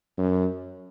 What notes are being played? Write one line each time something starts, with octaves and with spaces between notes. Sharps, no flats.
F#2